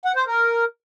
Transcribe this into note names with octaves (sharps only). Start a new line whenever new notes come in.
F#5
C5
A#4